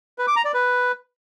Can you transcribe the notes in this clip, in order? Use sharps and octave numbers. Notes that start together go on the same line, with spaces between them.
B4
D6
A#5
D5
B4